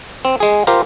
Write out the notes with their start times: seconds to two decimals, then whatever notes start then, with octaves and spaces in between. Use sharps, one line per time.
0.25 C4
0.40 G#3 G#4
0.67 F4 G4 A#4 C5